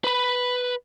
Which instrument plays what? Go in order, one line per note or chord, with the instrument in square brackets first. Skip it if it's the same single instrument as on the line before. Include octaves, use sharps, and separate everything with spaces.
[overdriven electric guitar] B4 B5